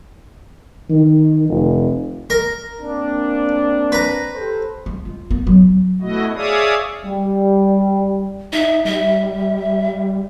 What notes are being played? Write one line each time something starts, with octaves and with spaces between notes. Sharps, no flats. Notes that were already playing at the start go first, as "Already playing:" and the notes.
D#3
F1
A#4 A#5
A#3 C4 D4
B4 A#5
G4 A4 C5
G#3
F4
B3
F#3
B2 A3 E4 F#4 D#5
G#4 C#5 D5 E5 F5 D#6
G3
D#4 E5
G3 E5